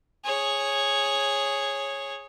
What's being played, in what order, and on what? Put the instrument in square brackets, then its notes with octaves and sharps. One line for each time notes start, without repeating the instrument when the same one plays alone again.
[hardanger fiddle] G#4 C#5